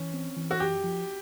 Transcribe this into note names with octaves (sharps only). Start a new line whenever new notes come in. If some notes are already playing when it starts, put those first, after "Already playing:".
Already playing: E3 C#4
C4
E3
F#4
F#2 G4
F3